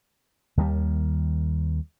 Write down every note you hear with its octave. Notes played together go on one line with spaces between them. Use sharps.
D#2 D#3 E3 G3